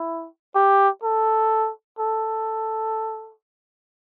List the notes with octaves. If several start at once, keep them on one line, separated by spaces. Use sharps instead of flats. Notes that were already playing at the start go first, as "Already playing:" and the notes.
Already playing: E4
G4
A4
A4